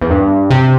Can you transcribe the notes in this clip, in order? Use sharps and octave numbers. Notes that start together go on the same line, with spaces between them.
E2
G2
C3